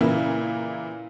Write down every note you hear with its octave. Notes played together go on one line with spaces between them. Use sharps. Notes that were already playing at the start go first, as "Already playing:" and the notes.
A#2 C#3 E3 A#3 E4